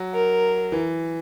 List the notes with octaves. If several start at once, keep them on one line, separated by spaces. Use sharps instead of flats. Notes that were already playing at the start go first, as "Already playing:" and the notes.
Already playing: F#3
A#4
E3